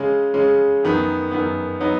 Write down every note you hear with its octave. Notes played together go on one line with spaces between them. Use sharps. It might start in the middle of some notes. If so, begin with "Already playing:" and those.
Already playing: C#3 G#3 C#4
C#3 G#3 C#4
F#2 D#3 B3
F#2 D#3 B3
F#3 B3 D#4